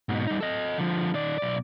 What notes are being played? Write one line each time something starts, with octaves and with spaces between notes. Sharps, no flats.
G#2 B2
G3 D#4
A4 D#5
D3 F3
D#3 D5
B1 D5